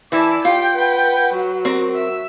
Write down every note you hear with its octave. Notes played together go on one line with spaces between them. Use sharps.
E3 E4 D5 A5
F4 G4 G5
B4 F#5
F#3
C4 A#4
E5